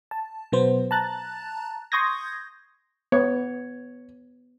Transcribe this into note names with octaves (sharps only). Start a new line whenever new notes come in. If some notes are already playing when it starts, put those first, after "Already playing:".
A5
B2 F#3 B3 C5
A5 A#5 F#6 A6
C6 C#6 D#6 G6 G#6 A#6
B3 C#5